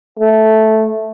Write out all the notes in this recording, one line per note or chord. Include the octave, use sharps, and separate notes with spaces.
A3